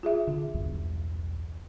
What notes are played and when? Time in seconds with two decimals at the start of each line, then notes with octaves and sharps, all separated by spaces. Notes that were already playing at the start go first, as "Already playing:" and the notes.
0.03 F4 G#4 E5
0.27 D3
0.54 B1 E2 G2